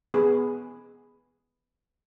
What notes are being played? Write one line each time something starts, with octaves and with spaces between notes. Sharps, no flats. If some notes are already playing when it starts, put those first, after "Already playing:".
B3 G#4 B4